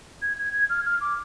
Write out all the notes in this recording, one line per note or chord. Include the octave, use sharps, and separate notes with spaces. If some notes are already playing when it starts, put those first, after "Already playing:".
G#6
G#6
G#6
F6
F6
D6